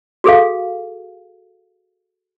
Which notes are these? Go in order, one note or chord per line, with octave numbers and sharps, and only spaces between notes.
F#4 G#4 A4 F5